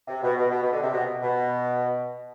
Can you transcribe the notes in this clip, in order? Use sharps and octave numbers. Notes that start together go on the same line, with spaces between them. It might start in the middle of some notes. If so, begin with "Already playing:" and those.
C3
B2
B2
B2
B2
D3
C3
B2
B2